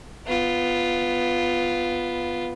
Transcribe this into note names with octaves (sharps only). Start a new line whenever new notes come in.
B3 F4